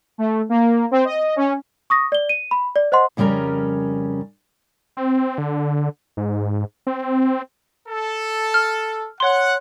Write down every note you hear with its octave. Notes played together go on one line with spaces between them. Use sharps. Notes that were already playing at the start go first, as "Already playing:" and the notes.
A3
A#3
C4
D#5
C#4
C#6 D#6 A#6
D5 G7
D#7
B5
D5
C5 D#5 F#5 C6
F2 C#3 G3 C#4 A#4 A#5
C4
D3
G#2
C4
A4
F6
C#5 F#5 C6